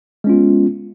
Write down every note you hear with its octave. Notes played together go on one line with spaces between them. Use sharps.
G#3 B3 C#4 F4